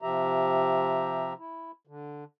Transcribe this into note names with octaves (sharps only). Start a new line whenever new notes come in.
C3 F3 G4 E5 A#5
E4
D3